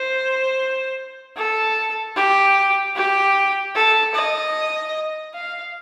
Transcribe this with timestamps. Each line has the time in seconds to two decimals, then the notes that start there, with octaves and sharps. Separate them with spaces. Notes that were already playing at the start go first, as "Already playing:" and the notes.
Already playing: C5
1.37 A4
2.16 G4
2.96 G4
3.75 A4
4.14 D#5
5.34 F5